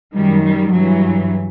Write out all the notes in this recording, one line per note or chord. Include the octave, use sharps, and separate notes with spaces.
F#2 D#3 G3
G3
G2 E3 F#3